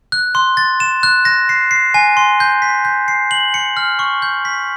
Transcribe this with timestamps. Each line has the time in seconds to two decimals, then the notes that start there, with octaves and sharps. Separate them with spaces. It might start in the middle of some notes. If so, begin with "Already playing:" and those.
0.12 F#6
0.35 C6
0.57 A6
0.80 E7
1.03 F#6
1.25 A#6
1.49 C7
1.71 C7
1.94 G#5
2.17 C6
2.40 G6
2.62 B6
2.85 G6
3.08 C7
3.31 F#7
3.54 C#7
3.77 F6
3.99 C#6
4.22 G6
4.45 B6